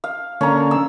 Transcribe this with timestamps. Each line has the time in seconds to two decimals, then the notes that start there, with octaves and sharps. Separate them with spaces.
0.04 F5
0.41 D3 A#3 C#4 A#5
0.71 E6